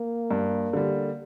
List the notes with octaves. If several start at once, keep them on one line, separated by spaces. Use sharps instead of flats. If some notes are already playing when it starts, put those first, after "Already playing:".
Already playing: A#3
G2
D3 G3